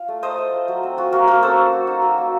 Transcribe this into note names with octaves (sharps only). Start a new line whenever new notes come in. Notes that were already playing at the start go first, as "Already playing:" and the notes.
Already playing: F4 F5
A3
A3 C5 D#5
A3
F4
F#3
C4
F4 F#4
A#3 F#4 A#4
A#3 F#4 A#4
C#4 A4 C5
C#4
F#3
D#4
F#3
A#3